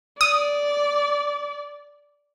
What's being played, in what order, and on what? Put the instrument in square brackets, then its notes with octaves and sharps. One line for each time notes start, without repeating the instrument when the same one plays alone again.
[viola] D5 [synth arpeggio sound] D#6